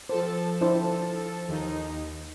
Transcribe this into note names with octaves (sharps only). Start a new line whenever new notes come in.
F3 A4 C5 A5
D4 E4 C5
D#2 D#4